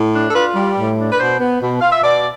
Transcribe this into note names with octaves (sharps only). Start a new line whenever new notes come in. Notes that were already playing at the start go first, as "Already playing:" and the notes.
Already playing: A2
D4
A4
F4 B4
G3
A2
D4
B4
B2 C5
B3
B2
F4 F5
E5
B2 D5